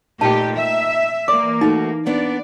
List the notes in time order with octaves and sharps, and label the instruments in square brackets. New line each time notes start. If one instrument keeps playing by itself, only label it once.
[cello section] A#2 A3 G4 [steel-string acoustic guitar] D#4 [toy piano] G5 A5
[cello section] E5
[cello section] E3 A#3 [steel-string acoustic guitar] D5 [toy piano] D6
[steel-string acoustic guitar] A3 F#4 [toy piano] D#4
[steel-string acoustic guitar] A#3 B3 D4 [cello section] D5